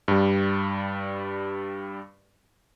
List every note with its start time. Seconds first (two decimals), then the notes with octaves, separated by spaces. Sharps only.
0.08 G2 G3